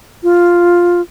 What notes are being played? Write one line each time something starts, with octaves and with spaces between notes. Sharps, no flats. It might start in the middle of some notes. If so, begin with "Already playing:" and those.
F4